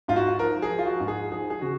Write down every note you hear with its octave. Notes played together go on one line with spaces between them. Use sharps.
G#2 F4
F#4
F3 A#4
G#4
F3
F4
F#4
G#2
G#4
F3 G#4
G#4
C#3 F#4